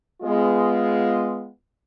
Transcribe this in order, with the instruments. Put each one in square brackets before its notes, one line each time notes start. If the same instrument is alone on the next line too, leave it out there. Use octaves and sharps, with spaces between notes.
[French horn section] G#3 B3 F4